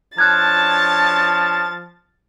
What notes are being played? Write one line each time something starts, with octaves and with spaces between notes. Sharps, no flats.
F3 D4 C#5 A5 F#6 G#6 A6